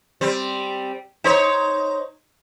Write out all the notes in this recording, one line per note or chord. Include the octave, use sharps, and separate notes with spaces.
G3 C4
D#4 C5 C#5